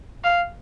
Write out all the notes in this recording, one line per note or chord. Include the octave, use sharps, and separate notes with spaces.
F5